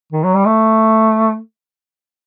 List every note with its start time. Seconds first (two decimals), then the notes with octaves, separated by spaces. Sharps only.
0.13 D#3
0.24 F#3
0.35 G3
0.46 A3